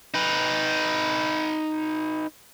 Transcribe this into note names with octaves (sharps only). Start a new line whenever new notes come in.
D#4 B4